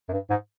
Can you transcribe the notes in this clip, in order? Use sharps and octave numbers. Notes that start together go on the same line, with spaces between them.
F#2
G2
G#2